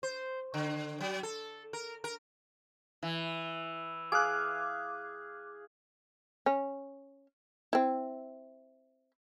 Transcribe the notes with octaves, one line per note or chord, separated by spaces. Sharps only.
C5
D3
F#3
A4
A#4
A#4
E3
G#4 F5 D6 F#6
C#4
C4 E4